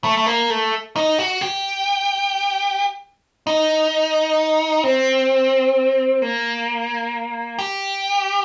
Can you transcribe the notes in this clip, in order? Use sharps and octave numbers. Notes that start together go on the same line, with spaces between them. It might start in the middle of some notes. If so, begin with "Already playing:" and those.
A3
A3
A#3
A3
D#4
F#4
G4
D#4
C4
A#3
G4